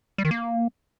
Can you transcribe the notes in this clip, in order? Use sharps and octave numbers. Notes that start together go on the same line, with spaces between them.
G3
D#3
A#3